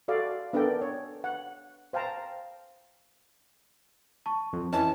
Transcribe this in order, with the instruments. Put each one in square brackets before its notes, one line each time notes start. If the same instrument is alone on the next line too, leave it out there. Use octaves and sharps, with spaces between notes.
[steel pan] F#4 A4 D5 F5
B3 D4 A4 A#4 D5 G5
C#5
F#5
C5 F5 G5 A5 A#5
[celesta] A5 C#6
[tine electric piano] F2
[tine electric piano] E3 C#4 [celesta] D#5 [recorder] A5